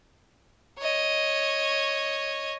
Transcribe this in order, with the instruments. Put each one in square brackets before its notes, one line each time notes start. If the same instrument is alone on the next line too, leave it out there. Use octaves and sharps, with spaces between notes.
[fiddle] C#5 D#5